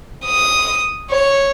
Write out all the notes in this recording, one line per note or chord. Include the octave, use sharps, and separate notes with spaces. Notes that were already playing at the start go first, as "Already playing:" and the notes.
D#6
C#5